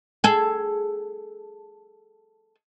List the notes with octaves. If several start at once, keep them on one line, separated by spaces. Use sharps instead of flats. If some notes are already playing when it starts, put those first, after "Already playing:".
G#4 A4